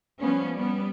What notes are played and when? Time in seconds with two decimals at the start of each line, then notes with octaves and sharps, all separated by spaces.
0.19 F3 G3 B3 C#4
0.54 G3 B3